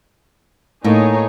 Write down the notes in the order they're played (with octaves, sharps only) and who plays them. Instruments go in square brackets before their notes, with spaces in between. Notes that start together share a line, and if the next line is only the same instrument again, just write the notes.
[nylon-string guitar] A2 A#3 [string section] D#4 G#4 C#5